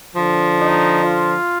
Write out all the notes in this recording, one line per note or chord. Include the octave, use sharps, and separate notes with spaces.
D3 F3
D#4
F4